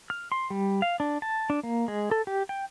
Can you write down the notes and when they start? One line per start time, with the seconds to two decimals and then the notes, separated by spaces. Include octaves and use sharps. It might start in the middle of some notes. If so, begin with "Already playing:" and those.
0.10 F6
0.32 C6
0.50 G3
0.82 F5
1.00 D4
1.22 A5
1.50 D4
1.63 A#3
1.88 G#3
2.11 A4
2.27 G4
2.49 G5